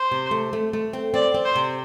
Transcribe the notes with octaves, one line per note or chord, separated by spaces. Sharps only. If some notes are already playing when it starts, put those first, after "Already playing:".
Already playing: C5
C3
A3
A3
A3
C4
C4 D5
C4
C5
C3